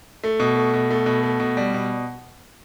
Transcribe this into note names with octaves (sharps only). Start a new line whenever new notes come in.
A3
B2
A3
B2
A3
B2
A3
B2
G3
B2